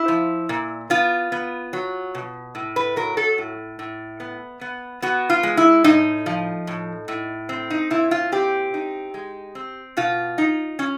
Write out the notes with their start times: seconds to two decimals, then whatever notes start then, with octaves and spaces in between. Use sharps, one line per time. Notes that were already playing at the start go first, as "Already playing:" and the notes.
Already playing: E4
0.08 F3
0.49 A#2
0.90 B3 F4
1.32 B3
1.73 F#3
2.15 B2
2.55 A2
2.76 B4
2.96 F#3 A#4
3.17 A4
3.38 A2
3.79 A2
4.20 B3
4.61 B3
5.02 B3 F#4
5.30 F4
5.43 G#3
5.57 E4
5.84 A2 D#4
6.26 F3
6.67 A2
7.08 A2
7.49 C4
7.70 D#4
7.90 A#2 E4
8.11 F4
8.32 C4 G4
8.74 D#4
9.14 G#3
9.55 C4
9.97 B2 F4
10.38 D#4
10.79 C#4